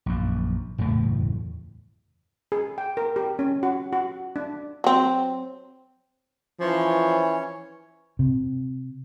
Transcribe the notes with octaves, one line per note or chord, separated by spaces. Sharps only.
A#1 F#2
F#1 E2 A2 A3
G#4
G5
A#4
G4
C#4
F#4
F#4
D4
F#3 C4
E3 F3 C#4 C#5
C3